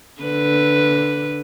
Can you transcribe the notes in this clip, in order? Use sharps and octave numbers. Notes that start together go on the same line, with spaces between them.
D3 B4